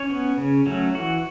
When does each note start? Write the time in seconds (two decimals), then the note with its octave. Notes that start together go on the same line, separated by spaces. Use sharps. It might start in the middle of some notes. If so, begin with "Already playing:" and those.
Already playing: C#4 C#5
0.10 B3
0.38 C#3
0.66 F#3 A3 C#4
0.95 E3 F#4